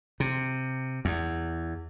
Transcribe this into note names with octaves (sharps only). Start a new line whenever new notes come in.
C3
E2